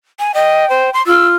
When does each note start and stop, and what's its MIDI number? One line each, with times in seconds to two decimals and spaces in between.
0.19 0.32 80
0.34 0.68 75
0.34 0.89 79
0.70 0.90 72
0.94 1.05 84
1.07 1.36 65
1.07 1.27 88